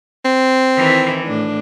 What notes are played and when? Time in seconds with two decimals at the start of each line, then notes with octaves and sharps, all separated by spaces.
0.25 C4
0.77 D#3 E3 E4
1.24 A2 D4